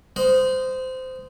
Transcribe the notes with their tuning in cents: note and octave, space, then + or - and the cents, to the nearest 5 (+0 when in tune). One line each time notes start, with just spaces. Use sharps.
C5 -20 D#5 +0 F#5 -40